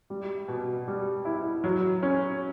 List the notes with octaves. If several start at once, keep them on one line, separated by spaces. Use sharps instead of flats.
G3
B2
G3
E4
F#3
C#4